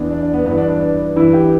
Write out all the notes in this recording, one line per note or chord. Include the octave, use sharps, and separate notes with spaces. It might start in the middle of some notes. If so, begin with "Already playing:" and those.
Already playing: E2 E3 D4
D4
D4
B3
G2 E3 B3
D4
D4
D4
G2 E3 E4
G4